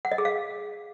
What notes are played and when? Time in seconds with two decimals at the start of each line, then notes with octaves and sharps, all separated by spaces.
0.05 F#5
0.12 D#5
0.18 G#4
0.25 F5